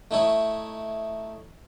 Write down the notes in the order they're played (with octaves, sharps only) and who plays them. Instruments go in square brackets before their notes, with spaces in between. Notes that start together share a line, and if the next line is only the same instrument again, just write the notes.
[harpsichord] A3 D#4 E4 C#5